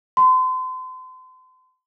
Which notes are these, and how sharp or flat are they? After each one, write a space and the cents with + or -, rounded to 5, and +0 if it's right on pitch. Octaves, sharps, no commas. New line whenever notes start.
C6 -35